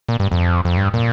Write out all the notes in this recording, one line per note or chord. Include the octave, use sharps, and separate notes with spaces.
A#2
G2
F2
F2
G2
A#2